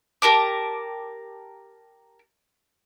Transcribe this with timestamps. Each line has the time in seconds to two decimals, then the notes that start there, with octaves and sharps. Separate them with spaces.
0.22 G4 A#4 A5 D6